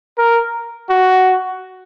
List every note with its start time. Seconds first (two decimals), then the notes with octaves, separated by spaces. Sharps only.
0.18 A#4
0.89 F#4